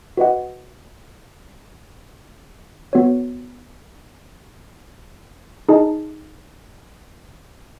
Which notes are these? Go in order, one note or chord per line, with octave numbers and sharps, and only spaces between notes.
F#4 B4 D#5 F#5
B3 F#4 C#5
D#4 G#4 D#5 A5